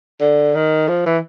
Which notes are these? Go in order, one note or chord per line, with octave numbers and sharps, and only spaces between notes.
D3
D#3
F3
E3